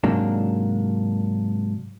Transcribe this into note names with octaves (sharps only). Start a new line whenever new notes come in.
G#2 C3 F#3 A#3 D4